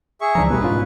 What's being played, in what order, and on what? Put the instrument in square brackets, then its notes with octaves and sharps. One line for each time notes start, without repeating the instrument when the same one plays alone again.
[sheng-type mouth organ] G#4 E5 C#6
[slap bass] C#2 E3 F3 [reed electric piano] D4 A#5
[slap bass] A1 [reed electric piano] B2 G3 A3 [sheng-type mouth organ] B4
[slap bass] G#2 [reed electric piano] C#4 F4